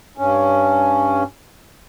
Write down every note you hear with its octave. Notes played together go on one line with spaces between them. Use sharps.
G2 C#4